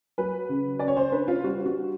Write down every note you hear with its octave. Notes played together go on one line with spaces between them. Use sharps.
F#3 B4
C#3
C#3 D5
C#5
C5
D4 B4
F4
G3 F#4
F#4